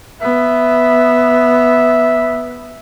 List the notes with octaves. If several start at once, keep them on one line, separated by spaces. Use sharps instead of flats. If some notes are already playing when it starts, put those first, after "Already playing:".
B3 E5